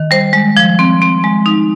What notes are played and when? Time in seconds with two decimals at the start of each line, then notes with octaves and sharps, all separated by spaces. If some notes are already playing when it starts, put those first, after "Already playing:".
Already playing: D#3
0.11 G3 C5
0.33 G#3
0.57 F3
0.79 C4
1.02 C4
1.24 G#3
1.46 D#4